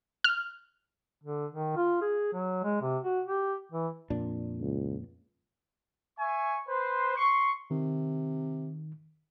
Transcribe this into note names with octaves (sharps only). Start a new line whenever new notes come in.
F6
D3
D#3
F4
G#4
F#3
G#3
C3
F#4
G4
E3
F2 A#2 D4
C#2
E5 G#5 C#6
B4 C5
C6 C#6
C3 D#3